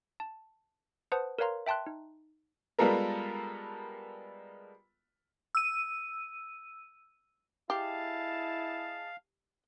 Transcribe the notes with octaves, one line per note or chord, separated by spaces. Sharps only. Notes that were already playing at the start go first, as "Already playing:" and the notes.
A5
B4 C5 F#5 A5 D#6
A#4 B4 C#5 F5 A#5 C6
E5 G5 A5 C6 F#6
D#4
G3 G#3 B3 F4 A4 A#4
E6 D#7
E4 G4 G#4 D#5 F5 A5